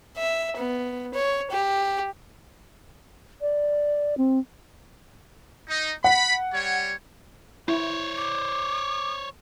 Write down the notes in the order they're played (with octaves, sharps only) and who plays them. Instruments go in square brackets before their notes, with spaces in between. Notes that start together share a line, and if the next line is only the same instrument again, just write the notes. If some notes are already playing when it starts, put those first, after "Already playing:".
[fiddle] E5
B3
C#5
G4
[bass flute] D5
C4
[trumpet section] D#4
[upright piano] F#5 [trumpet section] B5
[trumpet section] G3 C#5
[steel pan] E4 [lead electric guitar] C5 C#5
[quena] D6